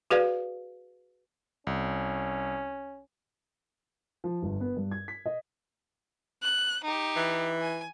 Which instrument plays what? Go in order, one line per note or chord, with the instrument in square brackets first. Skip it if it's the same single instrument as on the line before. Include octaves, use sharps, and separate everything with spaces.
[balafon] F#4 G#4 B4 D5 F5
[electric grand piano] C2 [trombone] C#4
[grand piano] F3
G1
B3
G2
G#6
B6
D#5
[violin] F#6
D#4 G4
[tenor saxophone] E3
[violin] G#5